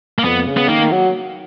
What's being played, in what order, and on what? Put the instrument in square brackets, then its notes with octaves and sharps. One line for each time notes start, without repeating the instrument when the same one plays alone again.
[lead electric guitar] A#3
[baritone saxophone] F2 [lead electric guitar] B3
[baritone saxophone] C#3
[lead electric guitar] B3
[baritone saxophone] D#3 [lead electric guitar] A#3
[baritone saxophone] F#3